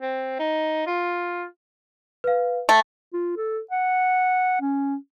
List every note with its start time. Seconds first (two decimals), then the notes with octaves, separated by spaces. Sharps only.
0.01 C4
0.39 D#4
0.87 F4
2.24 B4 F5
2.69 A3 G5
3.13 F4
3.37 A4
3.71 F#5
4.61 C#4